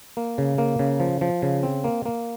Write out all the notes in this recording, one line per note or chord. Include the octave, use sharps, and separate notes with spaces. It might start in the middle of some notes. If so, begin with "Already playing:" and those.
A#3
C#3
A#3
C#3
F3
F3
C#3
C4
A#3
A#3